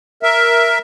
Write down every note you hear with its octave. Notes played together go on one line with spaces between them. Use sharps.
A#4 E5